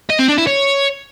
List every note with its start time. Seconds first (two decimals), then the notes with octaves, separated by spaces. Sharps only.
0.10 D#5
0.19 C4
0.29 D4
0.38 E4
0.47 C#5